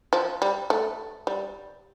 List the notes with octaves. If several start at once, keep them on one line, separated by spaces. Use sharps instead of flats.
F3
G3
A3
G3